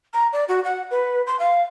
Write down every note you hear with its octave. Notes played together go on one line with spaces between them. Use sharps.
A#5
D5
F#4
F#5
B4
C6
F5